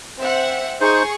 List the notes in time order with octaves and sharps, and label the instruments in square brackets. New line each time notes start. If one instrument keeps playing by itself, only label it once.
[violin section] C4 E5 F#5
[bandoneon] D#4 C5 [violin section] G#4 C#6